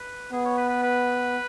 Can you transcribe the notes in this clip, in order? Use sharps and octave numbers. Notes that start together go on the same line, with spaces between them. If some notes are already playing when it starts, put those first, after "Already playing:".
Already playing: B4
B3 G#4
C#5
B4
B4
B4